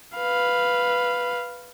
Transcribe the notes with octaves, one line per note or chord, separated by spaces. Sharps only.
B4 F5